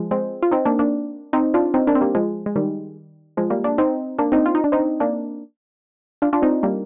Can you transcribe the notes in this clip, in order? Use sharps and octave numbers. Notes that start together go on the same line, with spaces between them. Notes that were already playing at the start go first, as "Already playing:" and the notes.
Already playing: F3 G#3
G#3 C4
F4
C4 D#4
A#3 D4
A#3 D4
C4 D#4
D4 F4
C4 D#4
A#3 D4
C4
G3 A#3
F3 G#3
G#3
D#3 G3
F3 G#3
G3 A#3
A#3 D4
C4 D#4
A#3 D4
C4 D#4
F4
D#4
D4
C4 D#4
A#3 D4
D4 F4
D4 F4
C4 D#4
G3 A#3